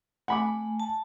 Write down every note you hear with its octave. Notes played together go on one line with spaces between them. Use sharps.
A3 F#5 G#5 B5 D6
A5